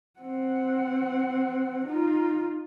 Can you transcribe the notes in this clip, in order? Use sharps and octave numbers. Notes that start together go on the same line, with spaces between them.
C4 F#5
D#4 F4